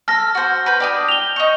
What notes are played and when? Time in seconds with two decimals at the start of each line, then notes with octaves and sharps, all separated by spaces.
0.08 A4 F6 A#6
0.35 F#4 C5
0.66 B4 B5 G6
0.80 D4 G4 D#6
1.09 F7 G7
1.36 D#4 C#6